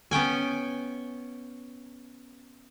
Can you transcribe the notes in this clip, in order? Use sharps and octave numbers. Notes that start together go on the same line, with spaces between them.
B3 C#4 G5 G#5